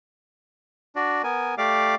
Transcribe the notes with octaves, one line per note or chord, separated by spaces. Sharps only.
D4 F#4 D5
B3 A#4 G#5
A3 G4 D5 F5 D6